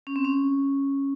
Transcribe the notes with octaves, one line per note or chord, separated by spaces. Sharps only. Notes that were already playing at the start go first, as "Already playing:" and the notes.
C#4
C4
C#4